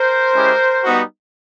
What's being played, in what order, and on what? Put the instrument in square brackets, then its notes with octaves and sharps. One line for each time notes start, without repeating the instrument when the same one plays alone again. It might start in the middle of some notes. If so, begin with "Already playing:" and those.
Already playing: [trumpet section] A#4 C5
G#3 C#4 E4 G4
G3 B3 D#4 F#4